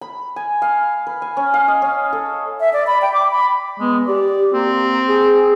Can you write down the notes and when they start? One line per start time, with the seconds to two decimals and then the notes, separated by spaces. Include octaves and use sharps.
0.01 B5
0.36 G#5
0.62 F5
1.07 B4
1.22 G#5
1.37 C#4
1.54 F5
1.68 D#5
1.82 C#4
2.13 A4
2.60 E5
2.73 D5
2.87 B5
3.02 G5
3.13 D6
3.31 B5
3.79 G#3 B3
4.07 G4 D5
4.53 A#3 C4
5.07 G#4